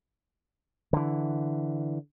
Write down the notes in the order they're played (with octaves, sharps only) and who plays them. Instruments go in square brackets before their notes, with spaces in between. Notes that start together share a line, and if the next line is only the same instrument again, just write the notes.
[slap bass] D3 E3